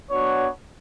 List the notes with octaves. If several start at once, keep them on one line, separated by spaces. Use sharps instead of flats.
B3 D4 F#4 C#5